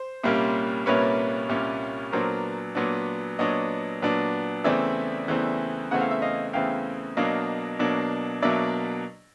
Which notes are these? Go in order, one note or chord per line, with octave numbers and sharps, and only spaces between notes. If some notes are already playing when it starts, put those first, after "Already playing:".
Already playing: C5
C2 A#2 G3 A#3 C#4
C2 A#2 G3 A#3 C#4 B4 C#5
C2 A#2 G3 A#3 C#4
A#2 F#3 B3 D4 A#4 C5
A#2 F#3 B3 D4
A#2 F#3 B3 D4 C#5 D#5
A#2 F#3 B3 D4
E2 C#3 E3 A3 C4 D5 E5
E2 C#3 E3 A3 C4
E2 C#3 E3 A3 C4 F#5
F5
E5
D#5 F5
E2 C#3 E3 A3 C4 F5 G5
B2 F#3 A#3 D4 D#5 F5
B2 F#3 A#3 D4
B2 F#3 A#3 D4 D5 E5